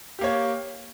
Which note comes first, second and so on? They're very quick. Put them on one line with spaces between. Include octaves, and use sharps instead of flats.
G4 A#3 C#5